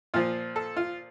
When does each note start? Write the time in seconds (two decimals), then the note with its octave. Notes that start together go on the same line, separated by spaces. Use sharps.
0.14 A#2 F3 F4
0.56 A4
0.77 F4